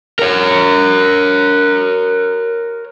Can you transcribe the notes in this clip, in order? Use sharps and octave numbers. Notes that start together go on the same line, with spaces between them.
A#4 C#5